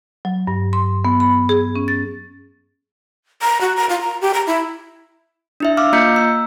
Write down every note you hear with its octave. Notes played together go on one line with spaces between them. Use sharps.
F#3
G2
C6
B3
B5
G#4
C#4
A6
A#5
F#4
A#5
F4
A#5
G4
A#5
E4
D4 E4 E5
F5 D6 E6 F6
A#3 F4 D#5 A#5 G6 C#7
E6